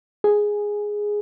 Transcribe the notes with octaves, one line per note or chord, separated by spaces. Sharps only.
G#4